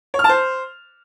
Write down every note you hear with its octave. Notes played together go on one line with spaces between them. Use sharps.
C#5
F6
A5
C5